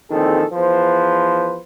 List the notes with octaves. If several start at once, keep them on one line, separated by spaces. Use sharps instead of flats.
A#1 D#3 E3 C4 G#4 A4
E2 F3 B4 C5